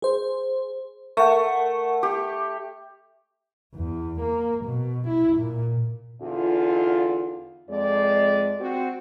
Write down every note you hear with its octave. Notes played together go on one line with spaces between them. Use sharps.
G#4 C5
A3 A#4 F#5
G4
E2
A#3
B2
E4
A#2
E2 D3 D#4 F4
F2 G#3 D5
C4 F#4